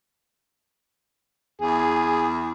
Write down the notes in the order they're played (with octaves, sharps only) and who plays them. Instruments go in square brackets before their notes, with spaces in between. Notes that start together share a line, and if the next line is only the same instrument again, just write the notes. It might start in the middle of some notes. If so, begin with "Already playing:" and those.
[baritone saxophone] E2 [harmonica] G#4